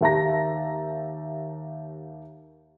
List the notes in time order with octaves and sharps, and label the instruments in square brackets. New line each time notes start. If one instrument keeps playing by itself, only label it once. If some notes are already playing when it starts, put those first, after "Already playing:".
[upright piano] D#2 G4 E5 A5 A#5 A#6